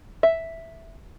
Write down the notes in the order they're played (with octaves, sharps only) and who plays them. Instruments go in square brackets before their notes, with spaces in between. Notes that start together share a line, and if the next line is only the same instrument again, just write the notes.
[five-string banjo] E5